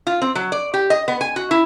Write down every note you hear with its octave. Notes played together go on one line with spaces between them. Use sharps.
F4
C4
F#3
D5
G4
D#5
B3
G#5
F#4
E4